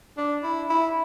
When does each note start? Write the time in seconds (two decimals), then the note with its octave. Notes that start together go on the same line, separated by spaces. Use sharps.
0.17 D4
0.43 E4
0.70 E4